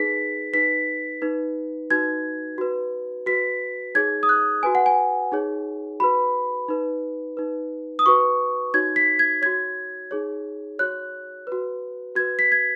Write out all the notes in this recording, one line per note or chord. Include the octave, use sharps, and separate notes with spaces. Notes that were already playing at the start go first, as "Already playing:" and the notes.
Already playing: D#4 G#4 B4 B6
D#4 B4 B6
D#4 B4
D#4 F#4 B4 G#6
F#4 B4
F#4 B4 B6
D#4 G#4 C#5 G#6
D#6
F#6
F#4 B4 G#5
F#5
G#5
D#4 G#4 C#5
F#4 B4 B5
D#4 B4
D#4 B4
D#6
F#4 B4 C#6
D#4 F#4 C#5 G#6
B6
G#6
F#4 C#5 G#6
D#4 G#4 C#5
F#4 C#5 F#6
F#4 B4
F#4 B4 G#6
B6
G#6